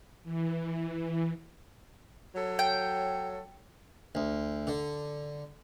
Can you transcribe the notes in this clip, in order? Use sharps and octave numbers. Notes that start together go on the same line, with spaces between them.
E3
F#3 A4 C#5
G5
D2
D3